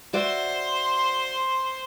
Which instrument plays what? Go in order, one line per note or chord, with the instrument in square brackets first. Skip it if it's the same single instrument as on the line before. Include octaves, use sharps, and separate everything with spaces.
[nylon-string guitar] F#4 D5 E5 [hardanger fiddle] C5 C6